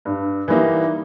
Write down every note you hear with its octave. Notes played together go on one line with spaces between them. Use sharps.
G2
E3 G3 A#3 D#4